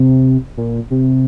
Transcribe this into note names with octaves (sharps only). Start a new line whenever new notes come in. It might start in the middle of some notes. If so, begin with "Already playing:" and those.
Already playing: C3
A#2
C3